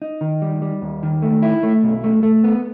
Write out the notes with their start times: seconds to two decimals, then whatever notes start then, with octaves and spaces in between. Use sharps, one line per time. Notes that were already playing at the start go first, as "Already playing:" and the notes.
0.02 D#4
0.21 D#3
0.42 G3
0.62 G3
0.82 D#2
1.03 D#3
1.22 A3
1.42 E4
1.63 A3
1.83 B1
2.04 A3
2.23 A3
2.44 B3